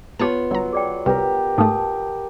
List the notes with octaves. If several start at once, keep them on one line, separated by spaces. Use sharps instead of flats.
B3 F4 G4 C#5 A5
G1 F#3 A#5
G#4 D5 G5
C2 G4 A#4 B4
G#2 A3 A5 D#6 E6